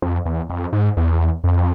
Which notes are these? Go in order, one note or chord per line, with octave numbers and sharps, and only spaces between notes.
F2
E2
F2
G#2
E2
F2